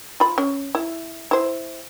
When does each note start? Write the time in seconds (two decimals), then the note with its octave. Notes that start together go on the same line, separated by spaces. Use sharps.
0.20 F4 B5
0.38 C#4
0.75 E4
1.31 E4 C5